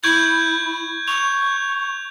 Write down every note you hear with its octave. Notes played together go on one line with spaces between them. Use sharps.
E4 C#6 G6 G#6
C#6 F7